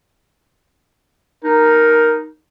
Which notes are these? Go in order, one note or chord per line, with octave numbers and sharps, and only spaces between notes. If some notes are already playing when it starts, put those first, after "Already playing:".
D#4 A#4